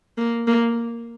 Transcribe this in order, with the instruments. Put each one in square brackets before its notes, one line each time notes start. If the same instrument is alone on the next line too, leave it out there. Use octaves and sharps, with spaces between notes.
[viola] A#3
A#3